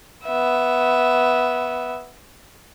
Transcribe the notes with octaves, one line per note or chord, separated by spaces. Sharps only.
B3 E5